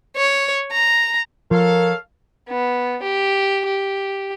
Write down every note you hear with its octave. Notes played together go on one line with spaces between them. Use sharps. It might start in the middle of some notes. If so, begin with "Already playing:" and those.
C#5
A#5
F3 A4 A#4 C#5 F5
B3
G4
G4